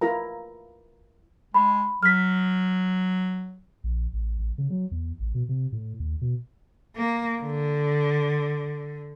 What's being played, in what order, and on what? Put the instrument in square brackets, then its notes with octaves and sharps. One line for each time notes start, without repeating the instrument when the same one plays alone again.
[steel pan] E4 F4 A#4 A#5
[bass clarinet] G#3 [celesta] B5
[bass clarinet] F#3 [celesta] F6 B6
[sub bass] A#1
A1
A1
C#3
F#3
E2
A1
B2
C3
A2
D#2
B2
[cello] A#3
D3